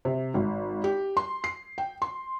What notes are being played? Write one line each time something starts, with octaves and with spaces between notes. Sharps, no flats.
C3
G#1
G4
C6
C7
G5
C6